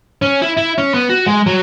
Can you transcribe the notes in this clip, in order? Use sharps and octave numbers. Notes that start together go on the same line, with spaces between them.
C#4
E4
E4
C#4
B3
F#4
G#3
F#3